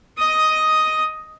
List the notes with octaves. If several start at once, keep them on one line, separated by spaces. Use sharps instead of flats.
D#5 D#6